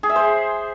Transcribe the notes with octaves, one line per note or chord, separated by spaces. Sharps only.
G#4
E5
C5